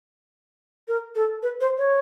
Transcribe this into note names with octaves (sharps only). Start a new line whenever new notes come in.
A#4
A4
B4
C5
C#5